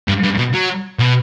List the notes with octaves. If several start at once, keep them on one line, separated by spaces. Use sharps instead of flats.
G2
G2
B2
F#3
B2